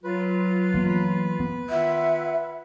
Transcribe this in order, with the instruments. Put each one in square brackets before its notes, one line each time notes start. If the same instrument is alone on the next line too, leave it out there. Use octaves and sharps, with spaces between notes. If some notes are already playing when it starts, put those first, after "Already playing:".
[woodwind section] F#3 F4 [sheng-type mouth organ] B4
[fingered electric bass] E3 A#3 B3
B3
[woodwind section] D#3 F4 F#5 [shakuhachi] E5